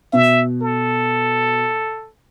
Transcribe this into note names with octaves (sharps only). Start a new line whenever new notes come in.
B2 E5
A4